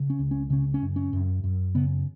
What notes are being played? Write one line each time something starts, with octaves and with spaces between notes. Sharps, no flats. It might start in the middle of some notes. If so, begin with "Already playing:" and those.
Already playing: C#3
C#4
C#2
C#4
C#3 C#4
C#4
F#2
C#4
F#2
F#2
C#3 B3